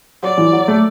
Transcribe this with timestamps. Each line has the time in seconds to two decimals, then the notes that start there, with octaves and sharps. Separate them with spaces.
0.23 F#3 D5
0.37 E3
0.53 F#3
0.68 A3